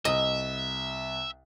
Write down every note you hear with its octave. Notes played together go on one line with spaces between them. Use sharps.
C2 D#5 E5